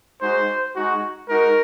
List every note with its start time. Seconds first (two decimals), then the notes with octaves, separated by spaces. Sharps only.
0.22 G#3 D#4 F#4 C5
0.75 G#3 D#4 F#4
1.28 G#3 D#4 F#4 A#4